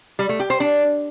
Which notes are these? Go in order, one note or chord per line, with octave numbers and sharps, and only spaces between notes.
G3
A3
G4
C5
D4